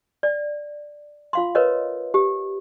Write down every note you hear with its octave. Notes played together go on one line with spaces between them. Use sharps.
D5
F4 F5 C6
A#4 B4 C#5 D#5
G4